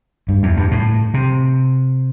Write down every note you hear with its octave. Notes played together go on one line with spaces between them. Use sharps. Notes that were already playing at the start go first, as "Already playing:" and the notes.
G2
E2
G2
A2
C3